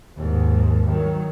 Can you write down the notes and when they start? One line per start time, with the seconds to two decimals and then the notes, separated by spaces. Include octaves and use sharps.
0.18 D#2 G#2
0.87 D#3 F#3